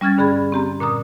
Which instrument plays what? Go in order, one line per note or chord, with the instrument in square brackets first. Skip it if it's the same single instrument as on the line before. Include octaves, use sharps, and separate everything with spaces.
[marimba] G3 C#4 F6 G#6 A6
G2 D3 G#4 B5
C4 G4 A#5
A#2 D3 A#5 D#6